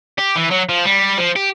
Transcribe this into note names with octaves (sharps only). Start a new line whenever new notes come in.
G4
E3
F#3
F3
G3
F3
G4